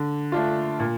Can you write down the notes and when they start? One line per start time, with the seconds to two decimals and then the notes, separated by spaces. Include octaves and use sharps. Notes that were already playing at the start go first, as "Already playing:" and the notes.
Already playing: D3
0.32 A3 D4 F4
0.80 A#2